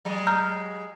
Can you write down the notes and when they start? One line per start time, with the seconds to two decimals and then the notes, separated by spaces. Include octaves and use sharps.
0.05 F#3 G#3 D#5
0.27 A#5 F6 G6